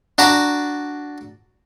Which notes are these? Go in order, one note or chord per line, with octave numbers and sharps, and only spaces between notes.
D4 F#4 A5 A#5